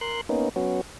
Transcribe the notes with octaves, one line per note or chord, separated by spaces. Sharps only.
A#4 C6 F#6
A#3 B3 C#4 D#4
F#3 B3 C#4 F#4